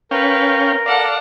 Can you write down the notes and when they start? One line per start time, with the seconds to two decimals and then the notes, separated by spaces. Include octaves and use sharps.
0.11 C#4 A#4 B4 F5 G5
0.86 A4 D5 F5 F#5